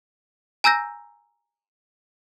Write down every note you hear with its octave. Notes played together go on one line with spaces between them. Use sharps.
G#5 A#5 E6 G6 A#6